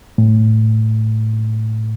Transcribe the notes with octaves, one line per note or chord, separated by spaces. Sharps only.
A2